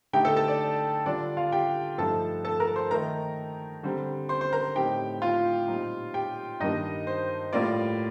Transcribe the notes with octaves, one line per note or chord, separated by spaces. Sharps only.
D3 A3 D#4 G4 G5
A4 A5
A4 A5
D5
D3 G3 D4 F4 D5
F4 F5
G4 G5
G2 F3 A3 D#4 A4 A5
A4 A5
A#4 A#5
C5 C6
D#3 A3 D#4 A#4 A#5
D3 G3 C4
C5 C6
C5 C6
A#4 A#5
A2 A3 C4 D#4 G4 G5
F4 F5
A#2 G3 C4 D#4
G4 G5
G2 D#3 G3 A#3 D4 D#4 D#5
C5
A2 G3 A#3 F4 D5